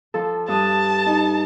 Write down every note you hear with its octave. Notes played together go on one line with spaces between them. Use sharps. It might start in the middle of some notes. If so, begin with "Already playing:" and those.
F3 A4
G2 A5 D#6
D#4